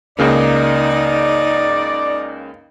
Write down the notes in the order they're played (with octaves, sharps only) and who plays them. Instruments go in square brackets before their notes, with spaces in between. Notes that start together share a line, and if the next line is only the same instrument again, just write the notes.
[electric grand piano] C#2 C#3 A#3 [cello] D#4 [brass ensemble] D5